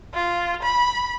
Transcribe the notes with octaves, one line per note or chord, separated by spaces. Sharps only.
F4
B5